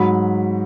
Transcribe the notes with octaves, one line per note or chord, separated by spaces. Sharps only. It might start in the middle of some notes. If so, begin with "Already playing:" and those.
Already playing: G#2 F#3 B5